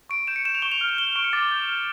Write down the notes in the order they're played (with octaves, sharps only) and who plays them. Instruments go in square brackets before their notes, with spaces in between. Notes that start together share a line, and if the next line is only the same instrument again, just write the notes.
[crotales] C#6 D7
G6 E7
C#7
G6 E7
F7
C#6 G7
F7
F6 G7
F7
G6 G7
F7
C#6 D7
C#7
D6 A6
G6
F6